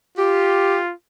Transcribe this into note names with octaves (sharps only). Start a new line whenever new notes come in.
F4 G4